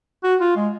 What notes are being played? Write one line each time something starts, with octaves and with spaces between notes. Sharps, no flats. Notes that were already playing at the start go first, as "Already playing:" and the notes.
F#4
F4
G#3